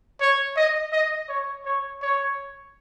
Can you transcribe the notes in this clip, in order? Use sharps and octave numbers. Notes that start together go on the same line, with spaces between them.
C#5
D#5
D#5
C#5
C#5
C#5